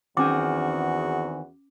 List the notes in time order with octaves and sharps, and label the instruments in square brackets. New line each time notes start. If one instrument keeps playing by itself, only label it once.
[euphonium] E2 [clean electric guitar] D#3 C4 G#4 [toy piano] C#4 D6 [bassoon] F#4